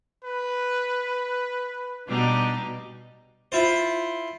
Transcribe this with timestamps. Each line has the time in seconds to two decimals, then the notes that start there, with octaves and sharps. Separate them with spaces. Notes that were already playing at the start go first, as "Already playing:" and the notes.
0.24 B4
2.07 B2 G3 D4 D#4
3.52 E4 F4 C5